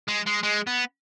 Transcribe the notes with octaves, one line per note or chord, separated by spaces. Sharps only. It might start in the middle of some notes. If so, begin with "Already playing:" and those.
G#3
G#3
G#3
B3